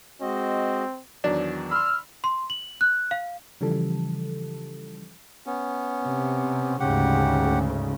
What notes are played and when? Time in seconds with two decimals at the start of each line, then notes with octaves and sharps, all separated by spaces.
0.21 G#3 C4 F#4 D#5
1.24 E2 D#3 F#3 D4
1.71 B5 C6 E6 F6
2.24 C6
2.50 F#7
2.81 F#6
3.11 F5
3.61 C#3 E3 F3 G3 A4
5.46 B3 C#4
6.03 C3
6.80 D2 G#2 C#3 G4 F#5